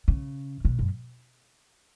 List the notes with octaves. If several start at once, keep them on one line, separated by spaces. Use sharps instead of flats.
C#3
B2
F#2